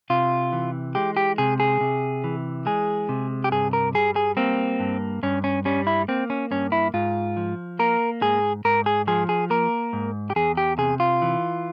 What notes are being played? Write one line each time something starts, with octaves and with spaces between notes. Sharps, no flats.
C3 F4
E3
G#3 G4
G4
C3 G#4
G#4
C3
E3
G#3 G#4
C3
G4
G2 G#4
A#4
G3 G#4
G#4
A#3 C4
G2
G2 C#4
C#4
G3 C#4
E4
A#3 C4
C#4
G2 C#4
E4
G#2 F4
F3
A#3 A#4
G#2 G#4
G#2 A#4
G#4
F3 G#4
G#4
A#3 A#4
G#2
G4
E2 G#4
G4
C3 G#4
F4
E3